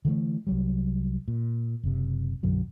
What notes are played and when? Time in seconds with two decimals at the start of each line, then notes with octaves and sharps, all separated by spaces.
0.05 D3 E3 G3 A3
0.47 C2 F#3 G3
1.28 A#2
1.84 F#1 C3
2.43 B1 F#2 D3 F#3